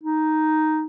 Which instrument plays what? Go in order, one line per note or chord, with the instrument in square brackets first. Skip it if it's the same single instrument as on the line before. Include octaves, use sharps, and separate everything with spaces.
[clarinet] D#4